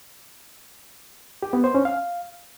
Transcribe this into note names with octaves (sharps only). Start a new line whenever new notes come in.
G4
B3
C5
C#4
F5